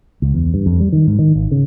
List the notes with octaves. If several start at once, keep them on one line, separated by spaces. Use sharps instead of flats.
C#2
E2
G2
F2
G3
D#3
G#2
D#3
G#1
C#3